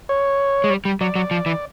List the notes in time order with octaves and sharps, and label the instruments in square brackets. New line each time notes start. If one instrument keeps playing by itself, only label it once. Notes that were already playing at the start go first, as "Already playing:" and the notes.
[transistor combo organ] C#5
[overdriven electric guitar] G#3
G3
G3
[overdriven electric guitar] F#3 [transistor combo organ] D5
[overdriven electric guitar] F#3
F3
E3